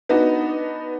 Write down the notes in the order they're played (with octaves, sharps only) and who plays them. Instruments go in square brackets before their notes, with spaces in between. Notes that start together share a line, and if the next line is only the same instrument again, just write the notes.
[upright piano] B3 D4 D#4 F#4